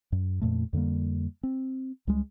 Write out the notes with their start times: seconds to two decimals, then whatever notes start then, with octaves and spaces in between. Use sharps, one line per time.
0.12 F#2
0.41 F2 A#2 A3
0.73 F2 D3 G3 A#3
1.43 C4
2.07 C#2 G3 G#3